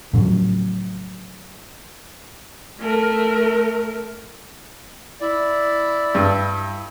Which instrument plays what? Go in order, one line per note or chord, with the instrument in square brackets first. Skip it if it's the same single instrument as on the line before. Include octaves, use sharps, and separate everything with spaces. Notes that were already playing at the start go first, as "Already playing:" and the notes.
[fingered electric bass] A2 C#3 F3 F#3
[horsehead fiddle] A3 A#4
[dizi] E4 [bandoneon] D5
[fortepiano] G2